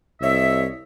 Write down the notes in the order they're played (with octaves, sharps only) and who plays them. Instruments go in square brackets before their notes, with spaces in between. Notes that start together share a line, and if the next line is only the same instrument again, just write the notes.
[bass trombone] C2 [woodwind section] C#5 D#5 E5